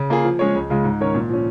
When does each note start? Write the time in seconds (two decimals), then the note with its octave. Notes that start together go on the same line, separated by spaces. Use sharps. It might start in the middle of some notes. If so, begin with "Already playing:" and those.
Already playing: C#3
0.10 A#3 F4 G#4
0.24 F3
0.39 G#3 C#4 G#4 C#5
0.55 C#2
0.70 C#3 G#3 F4
0.84 G#2
1.00 D#3 C#4 A#4 C#5
1.14 A#2
1.29 F3 C#4